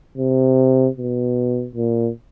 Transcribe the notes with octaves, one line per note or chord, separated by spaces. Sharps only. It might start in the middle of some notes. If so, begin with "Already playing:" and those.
C3
B2
A#2